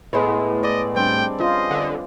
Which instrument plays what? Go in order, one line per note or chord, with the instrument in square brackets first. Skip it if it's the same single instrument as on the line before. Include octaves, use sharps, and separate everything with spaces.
[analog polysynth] A2 [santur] G#3 B3
[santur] D5 [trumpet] D#5
[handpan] G3 D4 [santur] C4 [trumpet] G5
[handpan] C#4 F4 C5 [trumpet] D#5
[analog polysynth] D3